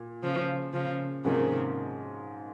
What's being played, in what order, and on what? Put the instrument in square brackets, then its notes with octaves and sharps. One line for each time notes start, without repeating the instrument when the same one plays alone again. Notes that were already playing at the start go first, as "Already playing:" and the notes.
Already playing: [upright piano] A#2
[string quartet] C#3 F3
C#3 F3
[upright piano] G#2 F3 A#3 C#4 [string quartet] C3 D#3